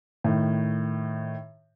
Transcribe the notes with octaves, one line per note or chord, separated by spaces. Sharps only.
A2 D#3